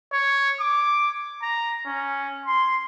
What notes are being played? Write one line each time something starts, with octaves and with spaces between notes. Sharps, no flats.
C#5
D6
A#5
C#4
C6